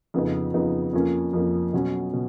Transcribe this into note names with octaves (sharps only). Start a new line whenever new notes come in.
F2 C#3 F3 B3 D#4
F2 C#3 F3 B3 D#4
F2 F3 A#3 C#4
F2 F3 A#3 C#4
B2 F#3 C#4
B2